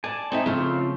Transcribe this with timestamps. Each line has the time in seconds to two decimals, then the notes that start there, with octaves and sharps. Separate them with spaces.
0.04 D5 G#5 A5
0.32 C4 D#4 E5
0.46 C#3 F3 A3 C4 F4